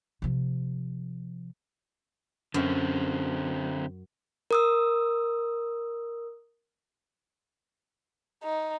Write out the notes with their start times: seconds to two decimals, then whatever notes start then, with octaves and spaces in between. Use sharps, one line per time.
0.22 C3 F3
2.54 F#2 D3 C4
4.51 A#4 D#6 E6
8.43 D#4